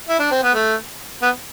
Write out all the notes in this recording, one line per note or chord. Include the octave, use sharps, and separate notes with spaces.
E4
D4
C4
B3
A3
B3